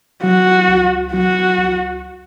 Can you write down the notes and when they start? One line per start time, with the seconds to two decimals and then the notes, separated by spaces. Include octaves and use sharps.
0.23 F#3 F#4
0.68 C#2
1.13 F#3 F#4
1.58 C#2